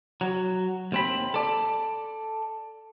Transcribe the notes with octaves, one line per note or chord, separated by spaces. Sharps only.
F#3
D#2 C4 B5
A4 D5